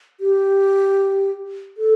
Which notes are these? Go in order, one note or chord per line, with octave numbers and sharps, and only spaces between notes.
G4
A4